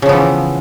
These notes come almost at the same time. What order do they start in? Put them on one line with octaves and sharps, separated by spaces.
C#3 F3 B3 E3